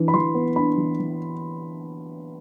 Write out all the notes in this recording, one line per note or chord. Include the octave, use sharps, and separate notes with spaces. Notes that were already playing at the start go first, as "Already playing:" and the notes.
Already playing: E3 D4
B5
E3 C6
B3
D4 B5
E3
E3